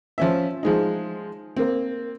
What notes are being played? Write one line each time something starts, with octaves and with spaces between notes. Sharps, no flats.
F3 C#4 E5
F3 G#3 D#4
A#3 C4